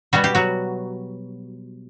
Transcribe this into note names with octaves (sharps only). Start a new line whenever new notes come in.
B2 G3 B3 F#4
G4
F#3 F#4